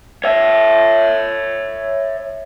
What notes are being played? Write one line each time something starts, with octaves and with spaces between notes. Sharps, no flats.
C#5 E5